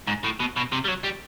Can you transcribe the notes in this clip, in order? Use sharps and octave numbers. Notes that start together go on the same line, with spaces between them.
G#2
A2
B2
B2
C3
G3
F#3
G3